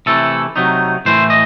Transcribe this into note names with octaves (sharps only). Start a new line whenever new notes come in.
C3 E3 A3 E4 A4
C3 F#3 A3 D#4
A2 E3 A3 E4 C5
D#5